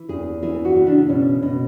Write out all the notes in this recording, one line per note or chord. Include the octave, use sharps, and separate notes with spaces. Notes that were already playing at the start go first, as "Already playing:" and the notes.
Already playing: E3
E2 G#4
E3 G#4
F#4
C#3
D4
B2 C#4
B2